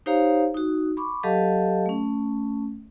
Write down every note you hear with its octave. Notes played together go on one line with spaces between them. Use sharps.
D#4 G4 C5 C#5 F5 A#5
D#4 F#4
B5 C#6 D6
F#3 G4 A4 D#5 F5 A5
A3 C#4